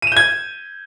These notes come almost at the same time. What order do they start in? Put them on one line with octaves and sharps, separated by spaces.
D#7 E7 G6 G#6